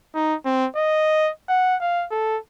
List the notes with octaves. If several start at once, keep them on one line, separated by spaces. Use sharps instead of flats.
D#4
C4
D#5
F#5
F5
A4